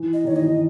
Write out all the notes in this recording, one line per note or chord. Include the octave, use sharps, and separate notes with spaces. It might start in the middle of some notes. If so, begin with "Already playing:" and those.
Already playing: E3
D#5
D#3 C#5
E3 D#5
D#3